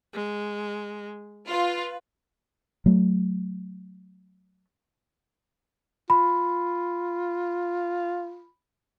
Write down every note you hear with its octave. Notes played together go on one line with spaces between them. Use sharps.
G#3
F4 B4
F#3 A3
F4 B5